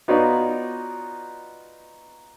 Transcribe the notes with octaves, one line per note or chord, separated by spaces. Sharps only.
B3 D#4 F4 F#4 C#5 D5